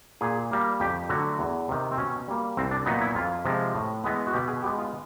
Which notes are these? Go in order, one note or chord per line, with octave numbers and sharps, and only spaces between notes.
A#2 G#4
G3 A#3
F2 G4
D3 F#3 A3 F#4
E2
C3 D#3
C4
B2 C#4
G3 A#3
C2 C4
D4
A#2 F#3 B3 D#4
E4
F2 F4
C3 F3 G#3
A2
E3 G#3 B3
F#4
B2 G4
G#4
G#3 B3 G4
F4